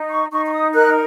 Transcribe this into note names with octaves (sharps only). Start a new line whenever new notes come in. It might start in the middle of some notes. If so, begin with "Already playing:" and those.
Already playing: D#4
C#6
D#4 C#6
C#6
D#6
A#4 F#6